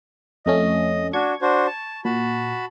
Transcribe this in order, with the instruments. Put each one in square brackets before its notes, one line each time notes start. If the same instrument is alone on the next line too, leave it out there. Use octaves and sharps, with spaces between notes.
[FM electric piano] F2 A3 C#4 [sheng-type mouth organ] D#5
[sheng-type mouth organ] D4 F#4 [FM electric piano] C#6 G#6
[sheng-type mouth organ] D4 F#4 C5
A5
[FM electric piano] A#2 [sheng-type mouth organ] F#4 A5 B5